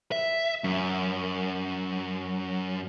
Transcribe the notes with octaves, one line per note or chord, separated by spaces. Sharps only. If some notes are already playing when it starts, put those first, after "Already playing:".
E5
F#2